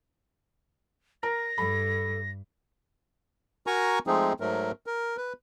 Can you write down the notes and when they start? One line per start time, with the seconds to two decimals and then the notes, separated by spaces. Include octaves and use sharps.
1.23 A#4 A#6
1.58 G2 A4 B5
3.67 F#4 A#4 G#5 A#5 C#6
4.07 F3 G#3 A3 C4 D#4 G#4
4.40 G#2 F#3 A3 A#4
4.86 A#4
5.17 B4